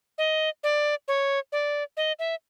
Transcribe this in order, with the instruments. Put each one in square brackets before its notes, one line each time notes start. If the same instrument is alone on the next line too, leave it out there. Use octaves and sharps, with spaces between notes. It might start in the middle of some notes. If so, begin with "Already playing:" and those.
[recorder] D#5
D5
C#5
D5
D#5
E5